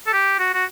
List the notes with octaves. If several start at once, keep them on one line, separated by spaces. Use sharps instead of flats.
A4
G4
F#4
F#4